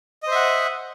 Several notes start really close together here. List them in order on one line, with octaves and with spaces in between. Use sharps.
D#5 C5 E5 F#5